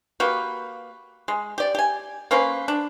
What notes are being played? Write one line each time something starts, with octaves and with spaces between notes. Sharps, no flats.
A#3 F#4 G4 B4
G#3
G4 D5
G4 G#5
A#3 C#4 B4 C5
D4